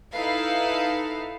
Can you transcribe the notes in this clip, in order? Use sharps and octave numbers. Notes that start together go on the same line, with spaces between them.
D#4 E4 A4 B4 F5